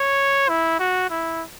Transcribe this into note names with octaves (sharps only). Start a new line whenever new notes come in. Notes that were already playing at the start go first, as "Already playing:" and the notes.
Already playing: C#5
E4
F#4
E4